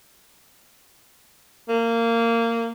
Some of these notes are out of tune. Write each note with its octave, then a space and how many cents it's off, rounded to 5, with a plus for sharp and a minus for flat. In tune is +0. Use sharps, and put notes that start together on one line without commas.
A#3 -20